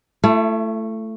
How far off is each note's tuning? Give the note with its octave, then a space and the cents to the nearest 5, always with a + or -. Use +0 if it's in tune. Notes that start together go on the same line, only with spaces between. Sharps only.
A3 +5 E4 +40